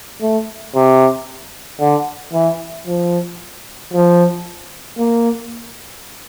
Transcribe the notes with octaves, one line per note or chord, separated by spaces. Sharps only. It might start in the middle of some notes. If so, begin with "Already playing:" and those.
A3
C3
D3
E3
F3
F3
A#3